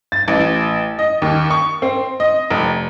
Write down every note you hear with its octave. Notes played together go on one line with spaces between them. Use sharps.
A6
A1
D#5
D#2
C#6
C4
D#5
F1